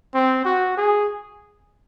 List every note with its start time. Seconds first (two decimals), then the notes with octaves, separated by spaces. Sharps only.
0.14 C4
0.45 F#4
0.77 G#4